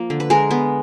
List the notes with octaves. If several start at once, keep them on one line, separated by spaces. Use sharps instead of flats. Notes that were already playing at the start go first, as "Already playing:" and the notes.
Already playing: F3 A#3
D3
B4
G#3 A#4
B3